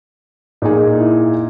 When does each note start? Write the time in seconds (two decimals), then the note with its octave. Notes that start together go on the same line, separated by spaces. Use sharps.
0.62 A#2 D#4 G#4
0.99 E4